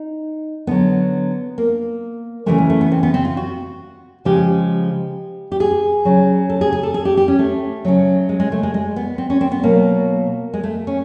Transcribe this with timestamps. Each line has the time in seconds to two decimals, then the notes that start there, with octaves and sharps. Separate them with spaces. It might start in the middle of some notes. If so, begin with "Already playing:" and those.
Already playing: D#4
0.67 D3 F#3 B3
1.58 A#3
2.46 C#3 E3 G#3 A3
2.58 G#3
2.70 A3
2.81 B3
2.92 C4
3.03 B3
3.14 C4
3.25 F4
3.37 F#4
4.25 C#3 F3 G#3 G4
5.52 G4
5.60 G#4
6.05 C#3 F#3
6.50 A4
6.61 G#4
6.72 G#4
6.83 A4
6.94 G#4
7.05 G4
7.17 G4
7.28 C#4
7.39 A3
7.85 C#3 F#3
8.29 G#3
8.40 G#3
8.52 A3
8.63 G#3
8.74 G#3
8.96 B3
9.18 C4
9.30 C#4
9.41 C4
9.52 B3
9.63 B2 F#3 A#3
10.53 G#3
10.63 A3
10.87 C#4